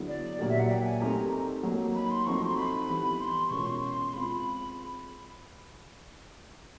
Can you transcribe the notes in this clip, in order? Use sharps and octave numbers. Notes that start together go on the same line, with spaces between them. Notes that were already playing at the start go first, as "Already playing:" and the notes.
Already playing: D3 F#3 B3 E4 G#4
D5
A#2 F#3 A#3 D4 G4
E5
F#5
G5
G#5
A3 C4 D#4 G4 A#4 A#5
F#3 A#3 D#4
B5
C6
F3 A3 C4 D#4 F#4 C#6
C6
B5
E3 G3 B3
C6
B2 G#3 C#4 F4 A#4 C#6
C6
C6
G#3 C4 F4 B5